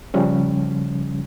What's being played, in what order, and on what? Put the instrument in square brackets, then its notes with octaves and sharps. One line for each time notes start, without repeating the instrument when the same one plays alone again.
[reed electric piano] C#3 F3 G3 C#4